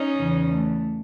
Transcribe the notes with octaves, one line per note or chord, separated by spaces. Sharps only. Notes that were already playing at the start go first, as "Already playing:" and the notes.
Already playing: C#4 D#4
E2 C#3 E3
A3